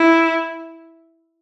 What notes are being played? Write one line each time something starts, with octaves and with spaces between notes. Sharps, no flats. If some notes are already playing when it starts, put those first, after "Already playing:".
Already playing: E4